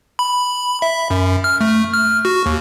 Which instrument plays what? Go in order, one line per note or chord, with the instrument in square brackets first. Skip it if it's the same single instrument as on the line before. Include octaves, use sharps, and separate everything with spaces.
[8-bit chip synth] B5
E5
F#2
F6
A3
F6
F#4
D#2